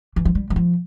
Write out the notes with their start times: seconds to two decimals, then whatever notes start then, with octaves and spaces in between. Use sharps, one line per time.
0.16 E3
0.25 F3
0.35 G3
0.50 G3
0.56 F3